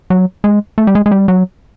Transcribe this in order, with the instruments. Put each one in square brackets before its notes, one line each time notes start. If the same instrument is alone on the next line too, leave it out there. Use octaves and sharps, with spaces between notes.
[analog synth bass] F#3
G#3
A3
G3
G#3
G#3
G3
F#3